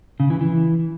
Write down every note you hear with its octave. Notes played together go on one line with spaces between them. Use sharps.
C#3
E3
E3